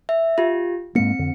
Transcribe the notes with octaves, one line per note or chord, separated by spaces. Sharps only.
E5
F4 G4
G#2 G#3 A#3 C4 C#7
F2 D3